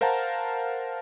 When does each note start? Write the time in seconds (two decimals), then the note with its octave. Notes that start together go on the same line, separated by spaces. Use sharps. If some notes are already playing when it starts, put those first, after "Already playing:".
0.01 A#4 C5 F5 F#5 A5 A#5